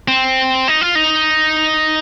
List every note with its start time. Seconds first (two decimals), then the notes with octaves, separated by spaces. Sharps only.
0.08 C4
0.68 D#4
0.81 F4
0.95 D#4